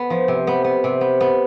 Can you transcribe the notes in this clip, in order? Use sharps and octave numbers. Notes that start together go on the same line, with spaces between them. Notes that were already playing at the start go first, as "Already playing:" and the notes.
Already playing: B3
F3
C3
B3
B3
C3
B3
B3